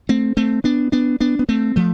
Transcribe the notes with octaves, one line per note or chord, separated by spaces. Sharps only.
A3 C4
A3 C4
B3 D4
B3 D4
B3 D4
B3
A3 C4
F3 A3